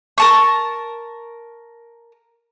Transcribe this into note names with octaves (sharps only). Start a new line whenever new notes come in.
A#4 A5 C#6